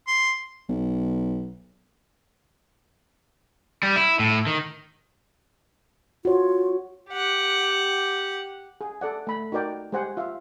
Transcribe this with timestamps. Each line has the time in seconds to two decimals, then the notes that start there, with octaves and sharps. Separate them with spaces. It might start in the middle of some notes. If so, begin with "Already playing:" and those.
0.07 C6
0.69 B1
3.83 G3
3.96 E4
4.19 A2
4.47 D#3
6.25 F4 F#4 C#5
7.10 G4 F#5
8.81 G#4
9.01 A4 D5 F#5
9.27 A3 B5
9.52 D#4 F#4 A#4 D5 G5
9.92 G#3 G4 C5 F#5 G#5
10.17 F4 E5 F5